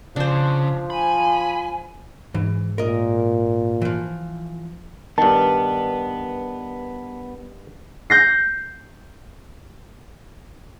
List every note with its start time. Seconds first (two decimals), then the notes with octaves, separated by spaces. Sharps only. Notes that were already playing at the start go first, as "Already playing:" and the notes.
0.16 C#3 F3 D4 C5
0.90 G#5 B5
2.35 G#2 E3
2.78 A#2 A#4 D#5
3.82 E3 F3
5.18 G2 D#3 B3 A5
8.10 G6 A#6 C7